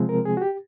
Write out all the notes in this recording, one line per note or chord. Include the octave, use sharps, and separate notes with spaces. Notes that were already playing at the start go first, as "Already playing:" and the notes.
Already playing: C3 F3 G#3 C4
A#4
G#4
F#4
G4